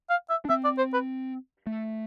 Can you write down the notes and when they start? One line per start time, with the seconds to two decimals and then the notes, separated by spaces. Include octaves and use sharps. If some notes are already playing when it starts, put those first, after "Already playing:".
0.10 F5
0.30 E5
0.45 D4
0.49 C4 E5
0.64 D5
0.78 C5
0.93 B4
1.67 A3